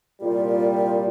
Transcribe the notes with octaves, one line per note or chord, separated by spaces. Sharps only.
C2 A#2 G3 F4